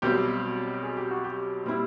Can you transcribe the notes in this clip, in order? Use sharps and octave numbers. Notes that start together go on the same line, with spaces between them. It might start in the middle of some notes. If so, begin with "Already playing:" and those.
B1 B2 G3 C4 G4
G#4
G4
F#4
G4
A#2 G3 C4 E4